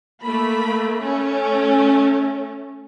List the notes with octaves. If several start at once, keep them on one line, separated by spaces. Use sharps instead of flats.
A3 A#3 B5
A3 C#4